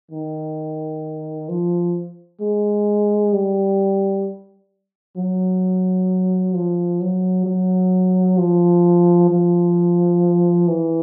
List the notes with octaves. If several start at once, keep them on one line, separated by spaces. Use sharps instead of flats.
D#3
F3
G#3
G3
F#3
F3
F#3
F#3
F3
F3
E3